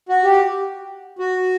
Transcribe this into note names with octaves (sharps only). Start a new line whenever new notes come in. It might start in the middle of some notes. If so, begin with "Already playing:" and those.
F#4
G4
F#4